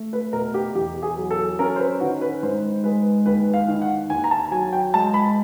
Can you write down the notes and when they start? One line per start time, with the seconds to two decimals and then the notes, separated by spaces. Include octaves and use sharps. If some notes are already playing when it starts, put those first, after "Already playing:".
Already playing: A3
0.13 B4
0.33 B2 A#4
0.54 G4
0.75 E2 G4
1.03 G#4
1.17 F#3
1.31 A4
1.59 C#4 A#4
1.76 C5
1.80 B4
2.00 D#3 F#4
2.21 B4
2.43 G#2 C5
2.84 G#3 B4
3.26 D#2 B4
3.54 F5
3.68 D#3
3.82 F#5
4.10 D#2 G#5
4.24 A#5
4.31 A5
4.52 F#3 G#5
4.73 G5
4.94 G#3 A5
5.14 B5
5.27 B5